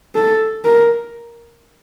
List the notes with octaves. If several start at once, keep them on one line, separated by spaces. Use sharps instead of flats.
A4
A#4